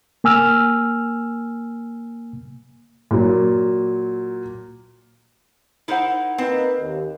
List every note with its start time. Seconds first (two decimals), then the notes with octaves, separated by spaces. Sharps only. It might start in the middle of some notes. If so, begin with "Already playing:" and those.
0.24 A#3 G#5 E6 F6
3.11 A#2 F#3
5.88 D#4 E4 A#4 C5 F#5
6.38 A#3 C4 D#4 B4
6.79 D#2